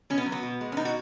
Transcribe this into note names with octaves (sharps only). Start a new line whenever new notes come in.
B2 C#4
B3
F#3
B3
B2
G#3
C#4
B2 D#4
F#4